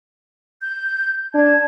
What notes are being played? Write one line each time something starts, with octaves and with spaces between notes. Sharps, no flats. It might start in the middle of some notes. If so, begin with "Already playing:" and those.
G6
D4 A5 G#6